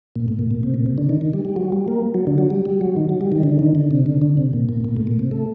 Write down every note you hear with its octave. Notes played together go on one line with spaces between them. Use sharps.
A#2
A2
A#2
A#2
C3
A#2
C3
D3
D#3
D#3
G3
G3
F#3
G3
A#3
F#3
D3
F#3
G3
G3
F#3
D#3
F#3
G3
D#3
D3
D#3
D3
C3
D3
D3
C3
A#2
A#2
A#2
A2
A#2
C3
A3